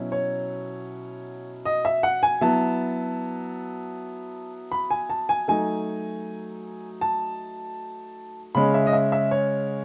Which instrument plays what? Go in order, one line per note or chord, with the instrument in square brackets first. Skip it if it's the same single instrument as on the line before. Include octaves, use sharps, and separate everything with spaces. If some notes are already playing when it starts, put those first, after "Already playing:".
Already playing: [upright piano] B2 F#3 C#4 E4
C#5
D#5
E5
F#5
G#5
F#3 B3 E4 A5
B5
G#5
A5
G#5
F#3 A3 D#4 G#5
A5
C#3 G#3 C#4 B5
E5
D#5
E5
E5
C#5